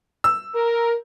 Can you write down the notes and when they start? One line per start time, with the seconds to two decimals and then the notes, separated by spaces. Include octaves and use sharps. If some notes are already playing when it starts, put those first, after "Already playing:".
0.24 E6
0.55 A#4